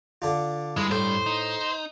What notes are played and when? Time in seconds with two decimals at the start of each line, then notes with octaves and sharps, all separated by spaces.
0.22 D3 D4 F4
0.77 G2 G#3 E4
0.91 A2 C5
1.26 D#4